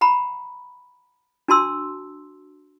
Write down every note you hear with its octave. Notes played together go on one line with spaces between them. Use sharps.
F#5 A#5 B5
D4 F#4 A5 C6 E6